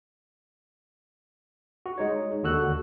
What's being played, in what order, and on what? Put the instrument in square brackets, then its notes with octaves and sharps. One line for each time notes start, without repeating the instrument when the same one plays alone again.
[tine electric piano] F#4
G#3 D#4 C#5
D#2 D3 F#4 E6 F#6